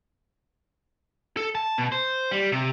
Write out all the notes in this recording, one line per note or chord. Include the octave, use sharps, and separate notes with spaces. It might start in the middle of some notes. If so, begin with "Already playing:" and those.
A4
A5
B2
C5
G3
C3